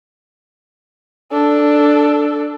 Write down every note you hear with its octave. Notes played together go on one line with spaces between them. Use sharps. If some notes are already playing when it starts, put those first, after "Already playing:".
D4 A4